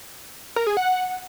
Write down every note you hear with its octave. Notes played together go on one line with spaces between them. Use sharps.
A#4
G#4
F#5